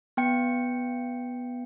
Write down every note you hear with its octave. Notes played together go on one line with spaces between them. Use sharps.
B3 G5 C#7